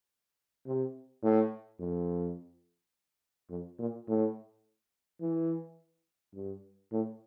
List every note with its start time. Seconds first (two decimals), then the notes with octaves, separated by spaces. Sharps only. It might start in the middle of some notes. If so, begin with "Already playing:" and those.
0.66 C3
1.23 A2
1.79 F2
3.50 F2
3.79 A#2
4.08 A2
5.21 E3
6.34 G2
6.92 A2